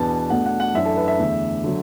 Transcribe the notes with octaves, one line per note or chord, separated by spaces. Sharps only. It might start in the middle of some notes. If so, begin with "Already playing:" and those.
Already playing: E2 B2 B3 D4 A5
B2 A3 D4 F#5
F#5
F#5
F#2 E3 D4 E5
A4
B4
E5
E2 D3 A3
D3 F#3